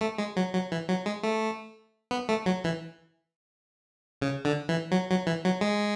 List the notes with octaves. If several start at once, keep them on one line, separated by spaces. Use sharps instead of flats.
A3
G#3
F#3
F#3
E3
F#3
G#3
A3
B3
A3
F#3
E3
C#3
D3
E3
F#3
F#3
E3
F#3
G#3